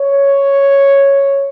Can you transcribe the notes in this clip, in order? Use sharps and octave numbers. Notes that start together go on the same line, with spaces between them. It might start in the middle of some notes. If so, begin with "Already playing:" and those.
Already playing: C#5